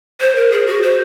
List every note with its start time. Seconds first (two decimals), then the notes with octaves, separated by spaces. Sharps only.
0.21 C5
0.36 A#4
0.52 G#4
0.67 F#4
0.82 C5